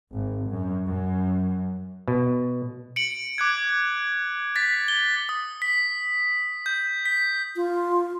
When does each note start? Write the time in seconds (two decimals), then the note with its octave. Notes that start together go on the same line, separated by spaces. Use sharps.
0.14 G#1
0.50 F#2
0.85 F#2
2.08 B2
2.96 C#7 D7 F#7
3.38 D6 F#6 G#6
4.56 A6 B6
4.88 G7
5.29 D#6
5.62 B6
6.66 G6
7.06 B6
7.56 F4